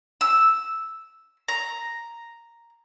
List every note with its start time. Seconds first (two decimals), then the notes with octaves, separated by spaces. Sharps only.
0.21 E6
1.48 A#5